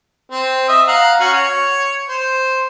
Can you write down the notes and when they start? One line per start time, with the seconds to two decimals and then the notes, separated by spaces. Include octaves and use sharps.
0.31 C4
0.68 D#5 E5
0.88 F5 F#5 A#5
1.20 C#4 F#4
1.33 C#5
2.09 C5